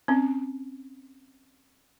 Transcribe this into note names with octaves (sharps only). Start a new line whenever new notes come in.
C4 C#4